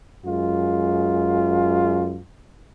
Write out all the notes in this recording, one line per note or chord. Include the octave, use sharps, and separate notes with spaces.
F#2 G#3 F4